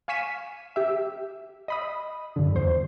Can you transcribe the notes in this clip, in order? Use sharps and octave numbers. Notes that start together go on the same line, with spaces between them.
F5 G#5 C#6 B6 D#7 E7
G4 E5
D#5 B5 D#6
G2 D3
E2 C5